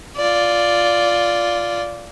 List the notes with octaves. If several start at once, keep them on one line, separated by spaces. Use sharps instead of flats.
F4 D5